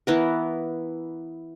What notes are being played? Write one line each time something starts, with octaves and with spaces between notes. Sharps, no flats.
E3 B3 A#4